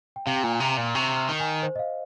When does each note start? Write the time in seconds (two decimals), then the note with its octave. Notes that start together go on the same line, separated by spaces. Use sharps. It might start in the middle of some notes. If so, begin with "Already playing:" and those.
0.16 G5
0.26 C3 F5
0.36 G5
0.43 A#2 G#5
0.60 C3 A#5
0.77 A#2
0.95 C3 C#6
1.17 F6
1.29 D#3
1.40 G#5
1.63 C5
1.76 D#5
1.79 F5